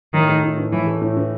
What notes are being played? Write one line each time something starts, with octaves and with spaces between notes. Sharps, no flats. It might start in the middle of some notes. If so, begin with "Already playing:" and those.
A2 D#3
A3
A2
E3
A2 E3
A3
A2
E3